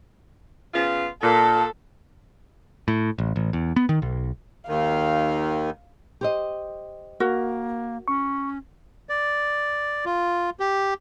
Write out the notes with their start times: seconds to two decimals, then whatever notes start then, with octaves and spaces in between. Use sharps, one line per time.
0.74 C#3 B3 F4
1.22 A#2 A4 A5
2.88 A2
3.18 A1
3.36 A1
3.53 E2
3.76 B3
3.89 D#3
4.02 B1
4.68 D#2 D#3 F5
6.21 G4 C5 D#5
7.20 A#3 F#4 A#4
8.08 C#4 C#6
9.09 D5
10.05 F4
10.60 G4